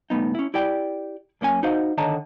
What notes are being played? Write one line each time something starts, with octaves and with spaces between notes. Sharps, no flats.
C#2 G2 A3 B3 D#4
C#4 E4
E4 G4 D5 G5
F#2 A#3 C#4 G#5
D#4 F#4 C5 D#5 F5
D3 D#3 C#5 D#5 A5 A#5